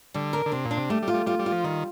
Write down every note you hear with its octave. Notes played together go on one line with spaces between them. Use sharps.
D3 G3
A#4
D3
C3 D4
A#2
D4
C3
G3 A3
G3
F4
G3
G3 F4
G3
F4
F3
D#3 G3